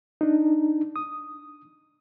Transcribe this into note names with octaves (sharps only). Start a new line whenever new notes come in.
D4 D#4
D#6